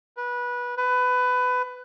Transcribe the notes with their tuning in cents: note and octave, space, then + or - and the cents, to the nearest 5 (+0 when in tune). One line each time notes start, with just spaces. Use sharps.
B4 -20
B4 +20